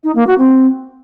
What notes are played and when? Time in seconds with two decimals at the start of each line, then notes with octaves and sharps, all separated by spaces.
0.03 D#4
0.15 A#3
0.26 F#4
0.38 C4